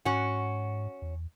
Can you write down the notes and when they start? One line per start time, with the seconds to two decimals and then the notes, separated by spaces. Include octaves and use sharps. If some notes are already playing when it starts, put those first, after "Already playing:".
0.05 G#2 C#4 F#4
1.02 E2